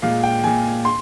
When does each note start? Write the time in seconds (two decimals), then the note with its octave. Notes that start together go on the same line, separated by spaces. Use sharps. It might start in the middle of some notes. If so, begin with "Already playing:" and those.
0.02 A#2 G#3 F5
0.23 G5
0.43 A#2 G#3 G#5
0.85 C6